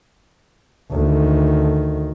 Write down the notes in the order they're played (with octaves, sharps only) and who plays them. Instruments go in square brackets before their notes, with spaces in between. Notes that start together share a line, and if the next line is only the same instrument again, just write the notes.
[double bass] D2 D#3